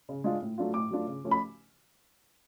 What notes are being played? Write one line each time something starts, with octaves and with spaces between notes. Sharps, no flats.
C#3
G#3 D4 F4
A2
F#3 A3 D4 F4
A2 D6
F#3 A3 D4 F4
C#3
F3 A3 C#4
B5